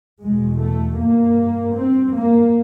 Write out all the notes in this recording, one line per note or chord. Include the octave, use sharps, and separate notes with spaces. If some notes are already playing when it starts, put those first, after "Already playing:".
E2 B2 G#3
A3
G2 A#3
G2 C4
A#3